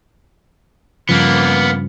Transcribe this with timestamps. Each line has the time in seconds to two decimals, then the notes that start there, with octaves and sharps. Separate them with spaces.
1.09 G2 C#3 F3 A#3 B3